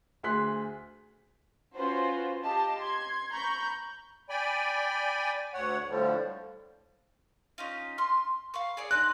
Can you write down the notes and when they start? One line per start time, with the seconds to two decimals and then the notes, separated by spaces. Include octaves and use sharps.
0.23 D2 G#4 C6 F#6 B6
1.74 C#4 F4 F#4 B4 C5
2.42 G4 D#5 F5 A5
2.78 C6 G#6
3.31 A#5 B5 C#6 G6
4.29 D5 G5 G#5 B5
5.54 D2 C#5 F#5
5.89 A2 D3 F3 G3
7.58 C#4 D#4 F4
7.98 C6 F6
8.54 F5 B5 C#6
8.77 G#4 C#5 D5
8.91 C4 D#4 F#6